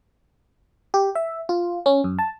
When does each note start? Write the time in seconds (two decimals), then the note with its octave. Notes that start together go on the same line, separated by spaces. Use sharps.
0.94 G4
1.15 E5
1.49 F4
1.86 C#4
2.04 F#2
2.19 A5